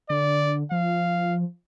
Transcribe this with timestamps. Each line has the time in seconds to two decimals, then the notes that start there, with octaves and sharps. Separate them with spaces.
0.10 D3 D5
0.72 F3 F5